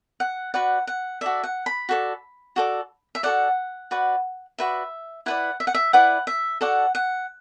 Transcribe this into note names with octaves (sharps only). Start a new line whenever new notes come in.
F#5
F#4 B4 D5 F#5
F#5
F#4 A4 D5 E5
F#5
B5
F#4 A4 D5
F#4 A4 D5
E5
F#4 A4 D5 F#5
F#4 B4 D5
F#4 B4 D5 E5
E4 B4 D5 F#5
E5
F#5
E5
E4 B4 D5 F#5
E5
F#4 A4 D5 F#5
F#5